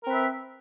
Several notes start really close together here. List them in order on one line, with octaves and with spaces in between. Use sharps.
A#4 C4 B4 E5